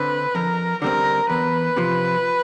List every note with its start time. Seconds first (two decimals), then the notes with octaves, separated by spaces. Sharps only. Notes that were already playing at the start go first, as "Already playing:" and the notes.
Already playing: D3 C4 B4
0.35 F2 A#4
0.82 D3 G3 C4 A#4
1.29 E2 B4
1.77 C3 F3